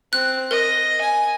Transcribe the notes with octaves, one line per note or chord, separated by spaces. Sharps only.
C4 F#6
A#4 D#5
G#5